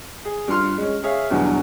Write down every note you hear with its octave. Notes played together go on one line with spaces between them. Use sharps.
G#4
G2 F4 C6 F6
G#3 C#4
G#4 C#5 E5 F5
E2 G2 B2 D3 F#3